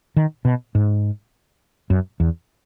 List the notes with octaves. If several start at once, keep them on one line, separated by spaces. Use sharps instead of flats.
D#3
B2
G#2
F#2
E2